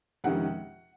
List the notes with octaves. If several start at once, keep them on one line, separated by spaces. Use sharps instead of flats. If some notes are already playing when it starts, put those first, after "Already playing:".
F2 C3 D#3 G#3 C#4 F#5